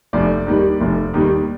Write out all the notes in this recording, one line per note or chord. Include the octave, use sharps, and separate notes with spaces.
F1 D5
D#2 D#3 G3
F1
D#2 D#3 G3